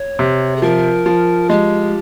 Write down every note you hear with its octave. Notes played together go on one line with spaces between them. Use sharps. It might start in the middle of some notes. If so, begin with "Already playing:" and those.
Already playing: C#5
C3
G#4
F3 A#4
F3
G#3 G4